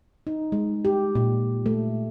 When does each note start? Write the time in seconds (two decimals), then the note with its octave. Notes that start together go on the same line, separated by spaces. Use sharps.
0.27 D#4
0.52 G#3
0.85 G4
1.15 A#2
1.66 A3